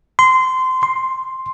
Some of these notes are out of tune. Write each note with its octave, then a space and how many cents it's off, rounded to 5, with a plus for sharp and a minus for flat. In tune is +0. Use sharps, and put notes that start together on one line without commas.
C6 -20
C6 +5